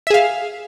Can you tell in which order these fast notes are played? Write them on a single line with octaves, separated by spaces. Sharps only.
E5 G#4 F5